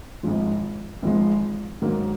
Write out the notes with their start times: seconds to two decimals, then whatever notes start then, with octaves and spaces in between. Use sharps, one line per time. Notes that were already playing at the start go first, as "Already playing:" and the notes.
0.23 G#1 G#2 F3 G#3
1.02 G#1 G#2 F3 G#3
1.82 G#2 D#3 F#3 A#3